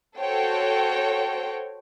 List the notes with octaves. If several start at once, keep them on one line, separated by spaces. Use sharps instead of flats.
F#4 A4 C5 C#5 G5